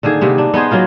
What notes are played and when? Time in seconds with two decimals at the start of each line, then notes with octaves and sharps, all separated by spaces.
0.03 D3 D#3 A#3 G#4
0.21 C3 A#3 B3
0.38 D4
0.54 B3 D#4 G#4 C5
0.71 F#3 A#3 F4 A#4